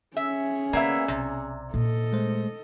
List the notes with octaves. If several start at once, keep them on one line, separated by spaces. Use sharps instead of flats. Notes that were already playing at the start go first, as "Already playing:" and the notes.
C#4 G#4 E5
C#3 A#3 B3 D5 E5 A#5 G#6
B1 C3
A#2 A#3 A4 D#5
G#3 A3 C5